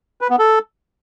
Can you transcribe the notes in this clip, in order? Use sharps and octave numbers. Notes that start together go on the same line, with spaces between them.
B4
B3
A4